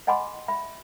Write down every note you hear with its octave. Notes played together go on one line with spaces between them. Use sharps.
D#5 F#5 G#5 B5 C6 D6
E5 B5